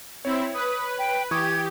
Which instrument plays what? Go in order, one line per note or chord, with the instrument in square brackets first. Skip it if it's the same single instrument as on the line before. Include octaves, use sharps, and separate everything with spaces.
[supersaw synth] C4 E4 [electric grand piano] C#5
[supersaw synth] B4 [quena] D#6
[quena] G5
[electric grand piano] E3 C#6 D#6 [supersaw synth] G4 [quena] G#6